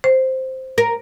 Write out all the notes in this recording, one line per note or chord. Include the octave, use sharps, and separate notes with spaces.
C5
A#4